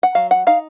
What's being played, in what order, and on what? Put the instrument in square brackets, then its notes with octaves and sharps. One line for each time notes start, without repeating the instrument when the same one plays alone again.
[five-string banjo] F#5
F#3 F5
F#5
D#4 F5